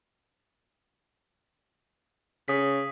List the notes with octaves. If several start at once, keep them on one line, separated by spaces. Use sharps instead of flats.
C#3 D#6 B6